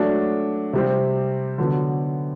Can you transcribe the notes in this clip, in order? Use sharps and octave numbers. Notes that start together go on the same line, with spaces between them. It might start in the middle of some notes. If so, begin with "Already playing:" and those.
Already playing: F#3 A3 D4
C3 G3 C4
D3 F#3 B3